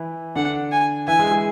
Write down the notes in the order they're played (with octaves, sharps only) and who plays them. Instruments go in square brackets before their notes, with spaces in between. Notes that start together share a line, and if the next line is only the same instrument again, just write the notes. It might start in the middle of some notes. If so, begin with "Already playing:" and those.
Already playing: [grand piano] E3 E4
[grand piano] D3 D4 [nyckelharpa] F#5
[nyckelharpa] G#5
[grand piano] E3 E4 [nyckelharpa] G#5
[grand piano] G#3 G#4
G#3 G#4